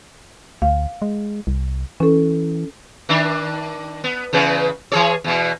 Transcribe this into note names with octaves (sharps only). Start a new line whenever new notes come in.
D2 F5
G#3
C2
E3 C#4 A4
D#3 D4
B3
E2 C#3 B4
E3 G#4 C#5
E2 B2